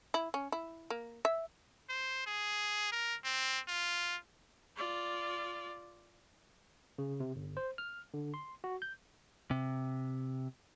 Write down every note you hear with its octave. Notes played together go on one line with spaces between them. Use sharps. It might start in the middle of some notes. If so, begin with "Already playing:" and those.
E4
C#4
E4
A#3
E5
C5
G#4
A#4
C4
F4
F4 D5
C#3
C3
G1
C5
F6
D3
C6
F#4
G6
C3